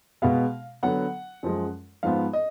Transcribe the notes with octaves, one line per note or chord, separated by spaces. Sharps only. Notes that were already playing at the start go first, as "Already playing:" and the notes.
B2 G#3 B3 F5
D3 F#3 B3 F#5
F#2 F3 G#3
G#2 F3 B3 F5
D#5